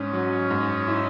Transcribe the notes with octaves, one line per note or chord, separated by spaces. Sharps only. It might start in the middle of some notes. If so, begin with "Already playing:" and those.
Already playing: G#2 C#4
F#3
G#2
E4